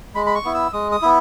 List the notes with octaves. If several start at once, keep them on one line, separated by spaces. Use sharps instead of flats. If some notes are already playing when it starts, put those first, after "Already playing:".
G#3 B5
B5
C#6
B3 E4
E6
G#3 D#6
D#6
B3 E4